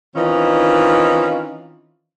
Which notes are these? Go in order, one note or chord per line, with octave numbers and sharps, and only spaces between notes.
D#3 E3 C4 C#4 D#4 F4